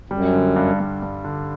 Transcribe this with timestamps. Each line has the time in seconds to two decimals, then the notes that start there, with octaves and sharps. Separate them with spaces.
0.10 F#2 G3
0.33 D3
0.56 G2
0.80 G2
1.02 G2
1.25 D3